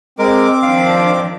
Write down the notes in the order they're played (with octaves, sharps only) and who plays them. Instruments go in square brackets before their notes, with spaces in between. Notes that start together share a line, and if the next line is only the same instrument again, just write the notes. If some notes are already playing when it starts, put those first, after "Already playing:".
[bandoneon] G#3 A#4 [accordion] C4 D6
[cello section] D#3 F3 D4 [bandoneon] F5